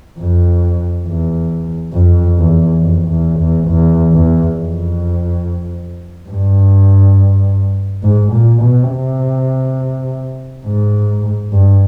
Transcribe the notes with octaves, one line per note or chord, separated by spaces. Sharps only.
F2
E2
F2
E2
F2
E2
E2
E2
E2
F2
G2
G#2
A#2
B2
C3
G#2
G2